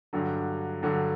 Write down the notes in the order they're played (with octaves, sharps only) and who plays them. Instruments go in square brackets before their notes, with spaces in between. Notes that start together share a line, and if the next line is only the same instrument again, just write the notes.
[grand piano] G2 D3 F#3
G2 D3 F#3